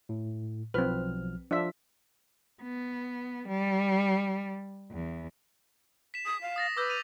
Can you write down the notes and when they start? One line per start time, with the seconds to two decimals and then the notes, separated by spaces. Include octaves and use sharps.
0.09 A2
0.74 B1 F3 C4 B4 F6
1.51 F3 D4 F4 E5 B6
2.62 B3
3.48 G3
4.91 E2
6.14 B6 E7
6.25 D#6
6.42 F5
6.56 D#6 A6 A#6
6.77 B4 D6 E6 G6
6.90 D#7 F7